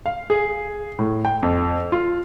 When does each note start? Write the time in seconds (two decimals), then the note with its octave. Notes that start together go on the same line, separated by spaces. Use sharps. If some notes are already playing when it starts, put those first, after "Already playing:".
0.06 F5
0.30 G#4
0.99 A2
1.25 G5
1.43 F2
1.92 F4